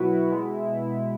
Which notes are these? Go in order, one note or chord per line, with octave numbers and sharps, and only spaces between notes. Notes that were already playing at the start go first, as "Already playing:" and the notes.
Already playing: B2 F#3 B3 E4 F#4 B4
B2 G#3 B3